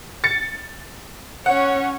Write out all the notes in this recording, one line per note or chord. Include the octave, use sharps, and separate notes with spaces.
A6 C#7
C#4 C#5 F#5